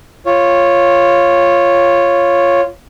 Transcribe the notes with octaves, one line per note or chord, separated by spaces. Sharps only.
F4 C#5